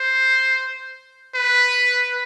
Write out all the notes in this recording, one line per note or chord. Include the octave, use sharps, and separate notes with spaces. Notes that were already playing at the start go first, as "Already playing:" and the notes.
Already playing: C5
B4